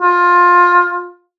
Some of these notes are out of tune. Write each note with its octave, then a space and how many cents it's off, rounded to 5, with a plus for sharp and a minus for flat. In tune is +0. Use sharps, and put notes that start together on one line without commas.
F4 +20